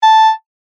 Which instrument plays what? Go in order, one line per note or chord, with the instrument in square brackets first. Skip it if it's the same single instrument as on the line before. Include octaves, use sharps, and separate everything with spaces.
[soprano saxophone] A5